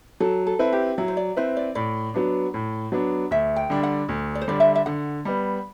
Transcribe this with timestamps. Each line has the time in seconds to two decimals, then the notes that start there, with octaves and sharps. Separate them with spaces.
0.20 F#3 A4
0.47 A4
0.59 C4 E4 B4
0.73 G4
0.98 F#3 E4
1.08 C5
1.17 D5
1.37 C4 E4 B4 C5
1.57 D5
1.75 A2 D5
2.14 F#3 B3 D4
2.54 A2
2.92 F#3 B3 D4
3.31 D2 E5
3.56 G5
3.70 D3 G3 D4
3.83 F#5
4.09 D2
4.35 D5
4.41 C5
4.48 D3 G3 D4 D5
4.60 E5
4.75 E5
4.86 D3 F#5
5.25 G3 B3